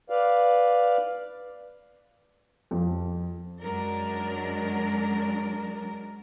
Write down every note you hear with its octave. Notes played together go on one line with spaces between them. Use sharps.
B4 D5 F5
F2
F#2 F#3 G#3 D4 A#4